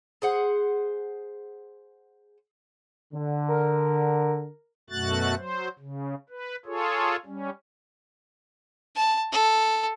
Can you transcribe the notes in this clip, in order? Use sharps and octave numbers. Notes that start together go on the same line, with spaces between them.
G#4 C5 F#5
D3
A#4
F#2 B2 A3 F#4 F#6 A6
F#3 C5
C#3
B4
F4 G#4 A4 C#5
G3 C#4
A5
A4